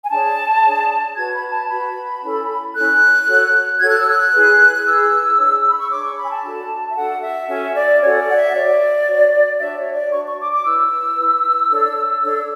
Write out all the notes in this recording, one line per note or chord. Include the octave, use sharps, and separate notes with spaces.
G#5
D4 G#4 C#5 A5
D4 G#4 C#5
F#4 B4 G#6
B5
A5
F#4 B4 B5
C#4 E4 A4
C#4 E4 A4 F#6
F#4 A4 C#5
F#4 A4 C#5 G#6
F#6
E6
F#6
E4 G#4 B4
F#6
E4 G#4 B4 E6
D4 G#4 C#5
B5
C#6
D4 G#4 C#5 D6
C#6
B5
G#5
A5
D4 F#4 A4
E5
D4 F#4 A4 F#5
E5
C#4 F#4 A4 E5
D5
C#4 F#4 A4 C#5
D5
F#5
E5
F#4 C#5 D5
F#4 C#5
D4 F#4 C#5 E5
C#5
D5
D4 F#4 C#5 C#6
C#6
D6
D6
E4 B4 E6
E4 B4
D4 A4 C#5
D4 A4 C#5